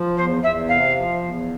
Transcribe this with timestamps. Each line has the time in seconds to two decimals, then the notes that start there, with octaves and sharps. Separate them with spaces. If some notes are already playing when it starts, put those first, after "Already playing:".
Already playing: F3
0.17 E2 C5
0.43 E2 E5
0.69 C3 F5
0.95 F3
1.21 E2